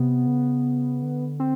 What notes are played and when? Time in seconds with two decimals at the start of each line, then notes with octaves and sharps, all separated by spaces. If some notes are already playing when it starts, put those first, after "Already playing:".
Already playing: C3 B3
0.27 C#3
1.02 D3
1.40 C4